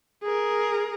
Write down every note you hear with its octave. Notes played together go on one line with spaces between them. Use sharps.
G#4 A#4